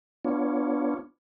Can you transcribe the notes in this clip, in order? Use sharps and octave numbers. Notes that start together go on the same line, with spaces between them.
B3 D4 F4 C#5